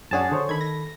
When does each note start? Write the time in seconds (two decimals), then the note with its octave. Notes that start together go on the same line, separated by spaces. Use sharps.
0.11 F#2 C#4 D4 F#4 G#4 A5
0.32 D3 C5 C#5
0.49 D#3 A4 B5 G#6
0.61 A#6